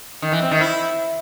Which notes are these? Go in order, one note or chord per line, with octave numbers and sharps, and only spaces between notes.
D#3
E3
C4
D#3
E4